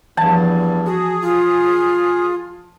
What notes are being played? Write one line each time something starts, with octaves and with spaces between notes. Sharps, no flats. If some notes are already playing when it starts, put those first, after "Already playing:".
E2 G2 E3 F3 A5
F#4 G#4
F4